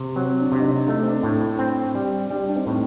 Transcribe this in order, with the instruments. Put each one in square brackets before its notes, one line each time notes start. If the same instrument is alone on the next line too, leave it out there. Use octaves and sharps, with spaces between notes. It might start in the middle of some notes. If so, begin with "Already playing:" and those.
Already playing: [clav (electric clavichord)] C3
[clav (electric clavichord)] F#3 [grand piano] C4
[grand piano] D4
[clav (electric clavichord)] C3
[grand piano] D#4
D4
[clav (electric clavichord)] A3 [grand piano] D#4
[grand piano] D4
C4
D4
[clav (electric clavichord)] A2
C4
G3
[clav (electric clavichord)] G3 [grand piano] D4
[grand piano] D4
C4 D#4
[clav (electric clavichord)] A2